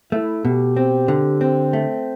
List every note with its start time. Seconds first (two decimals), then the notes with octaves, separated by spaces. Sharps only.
0.12 A3 E4
0.45 B2 G4
0.77 C4
1.08 D3
1.41 C4
1.73 A3